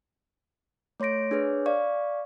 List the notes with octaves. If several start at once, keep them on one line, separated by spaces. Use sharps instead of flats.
A3 C#5 C6 A#6 D7
D4 G#4 B4 C#5
D5 F5 C#6